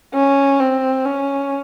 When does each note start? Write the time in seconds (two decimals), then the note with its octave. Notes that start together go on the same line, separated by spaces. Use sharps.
0.14 C#4
0.60 C4
1.05 C#4